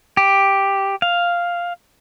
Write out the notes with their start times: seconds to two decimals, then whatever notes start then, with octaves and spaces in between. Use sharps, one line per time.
0.17 G4
1.02 F5